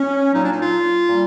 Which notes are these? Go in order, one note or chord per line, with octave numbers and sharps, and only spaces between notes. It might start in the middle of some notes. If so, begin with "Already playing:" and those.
Already playing: C#4
A#2 F#3 D#4
D4
D#4
F4
A#2 G3